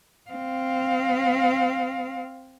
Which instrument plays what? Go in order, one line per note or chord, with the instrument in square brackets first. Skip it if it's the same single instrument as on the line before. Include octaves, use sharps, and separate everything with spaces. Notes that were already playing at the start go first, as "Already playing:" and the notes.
[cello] C4 F5